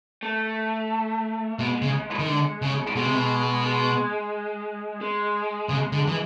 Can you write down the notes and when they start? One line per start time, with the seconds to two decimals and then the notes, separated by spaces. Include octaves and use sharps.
0.23 A3
1.59 B2 G#3
1.82 C#3
2.19 D#3
2.28 D3
2.62 C#3
2.95 B2 G#3
3.05 C3
3.15 B2
3.64 G#3
5.01 G#3
5.69 C#3
5.92 D3
6.08 E3